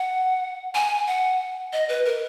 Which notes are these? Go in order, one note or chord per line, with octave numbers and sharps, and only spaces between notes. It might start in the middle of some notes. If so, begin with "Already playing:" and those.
Already playing: F#5
G#5
F#5
D#5
B4
A#4